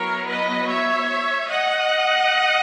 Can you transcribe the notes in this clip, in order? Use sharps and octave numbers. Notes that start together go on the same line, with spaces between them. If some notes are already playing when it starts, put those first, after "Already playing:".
Already playing: F#3 B3 E4 A#4 C#5
B4 D#5
C#5 E5
D#5 F#5